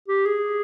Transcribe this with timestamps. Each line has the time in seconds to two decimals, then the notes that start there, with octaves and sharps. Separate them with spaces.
0.08 G4
0.26 G#4